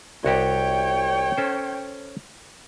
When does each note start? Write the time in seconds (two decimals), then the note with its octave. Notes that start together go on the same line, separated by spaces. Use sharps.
0.25 C2 F#4 G4 C#5 G5
1.37 C#4 A4 C5